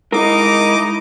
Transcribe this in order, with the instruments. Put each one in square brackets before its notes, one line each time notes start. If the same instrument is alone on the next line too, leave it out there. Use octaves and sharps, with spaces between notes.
[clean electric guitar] G#3 A#4 [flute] D#4 [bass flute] E4 [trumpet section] D#5 D6